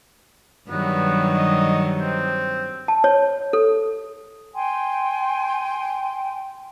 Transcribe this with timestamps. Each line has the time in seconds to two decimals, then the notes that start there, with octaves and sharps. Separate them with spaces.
0.70 G2 D#3 F#3 B3
1.36 D#5
1.99 C4
2.88 A5
3.04 C#5
3.53 A4
4.56 G5 G#5 C6